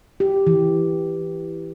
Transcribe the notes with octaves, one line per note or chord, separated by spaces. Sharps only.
G4
E3